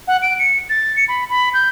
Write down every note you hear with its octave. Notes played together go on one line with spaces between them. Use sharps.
F#5
D7
C#7
A6
C#7
B5
B5
G6